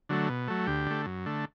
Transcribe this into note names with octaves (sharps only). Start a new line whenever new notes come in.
D3 F#3 A3
B2
F#3 A3
D2 G4
D3 A3
F#2
D3 A3